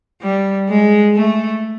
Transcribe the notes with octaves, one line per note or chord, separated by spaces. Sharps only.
G3
G#3
A3